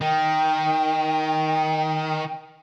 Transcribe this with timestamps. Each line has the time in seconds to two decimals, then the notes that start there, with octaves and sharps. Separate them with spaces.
0.01 D#3 G5